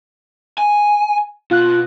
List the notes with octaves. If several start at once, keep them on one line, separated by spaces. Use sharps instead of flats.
G#5
B2 F4 F#6